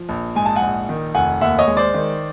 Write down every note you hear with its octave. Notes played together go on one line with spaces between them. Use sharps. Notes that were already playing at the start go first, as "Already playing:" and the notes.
Already playing: F3
A#1
G#2 G#5
A5
F#5 G#5
A#1
D#3
F1 F#5 G#5
D#2 E5 F#5
C#5 D#5
G#3
C5 D5
D#3